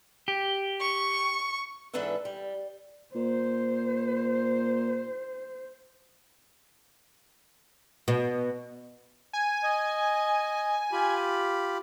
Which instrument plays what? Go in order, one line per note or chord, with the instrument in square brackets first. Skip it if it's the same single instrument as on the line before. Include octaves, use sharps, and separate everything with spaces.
[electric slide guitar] G4
[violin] C#6
[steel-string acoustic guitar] G#2 E3 D4 A4 B4 E5
G3
[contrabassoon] A#2 [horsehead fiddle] C5
[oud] B2
[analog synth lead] G#5
[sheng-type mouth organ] D#5
F4 G4 B5